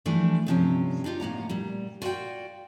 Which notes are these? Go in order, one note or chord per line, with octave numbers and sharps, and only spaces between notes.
E3 F3 G3 A3 B3 D4
D2 G2 C3 F3 C#4 G5
D4 D#4 F4 G4
A2 A#3 F#5 A#5
A#2 G3
F4 F#4 D5 E5 F#5 G5